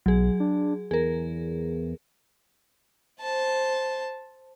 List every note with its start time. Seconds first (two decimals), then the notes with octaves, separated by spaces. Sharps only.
0.06 B1 F#3 G#4
0.40 D4
0.91 E2 G#4 A#4
3.21 C5 A5